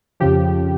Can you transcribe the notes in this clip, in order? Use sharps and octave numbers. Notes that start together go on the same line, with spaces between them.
F2 C#3 F3 G4